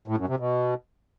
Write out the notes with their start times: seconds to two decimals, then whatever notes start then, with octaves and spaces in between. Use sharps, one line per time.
0.08 A2
0.18 F#2
0.29 C3
0.39 B2